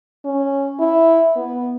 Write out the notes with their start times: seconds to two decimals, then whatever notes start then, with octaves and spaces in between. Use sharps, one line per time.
0.25 C#4
0.79 E4
1.36 B3